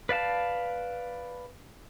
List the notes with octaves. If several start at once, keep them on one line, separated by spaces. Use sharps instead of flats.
B4 D5 F5 A5